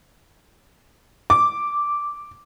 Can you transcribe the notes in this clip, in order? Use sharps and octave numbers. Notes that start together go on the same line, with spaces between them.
D6